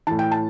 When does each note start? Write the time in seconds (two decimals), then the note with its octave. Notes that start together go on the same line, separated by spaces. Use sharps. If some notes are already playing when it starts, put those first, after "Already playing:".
0.07 A2 E3 A5
0.19 G5
0.31 A5